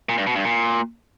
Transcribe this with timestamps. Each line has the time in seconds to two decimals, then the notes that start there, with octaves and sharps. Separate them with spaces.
0.09 A#2
0.18 G2
0.27 B2
0.36 G2
0.45 A#2